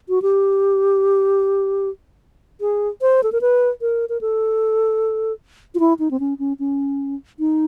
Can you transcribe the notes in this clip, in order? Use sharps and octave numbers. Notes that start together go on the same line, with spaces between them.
F#4
G4
G#4
C5
A4
A#4
B4
A#4
A#4
A4
F4
E4
D#4
C4
C#4
C#4
C#4
D#4